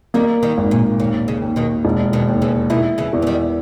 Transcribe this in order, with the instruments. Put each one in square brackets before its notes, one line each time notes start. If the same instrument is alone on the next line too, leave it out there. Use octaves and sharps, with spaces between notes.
[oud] D#3 G3 [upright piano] A#3
[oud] D#3 G3
[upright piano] G#1
[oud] A#2
[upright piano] D#2 [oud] A#2
[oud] C#3
[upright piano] D#2
[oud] B2 D#3
[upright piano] E1
[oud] B2 D#3
[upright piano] D#2
[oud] C#3 E3
[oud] B2 D#3 [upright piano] E4
[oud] C#3 E3
[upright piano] E2
[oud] E3
D#3 G3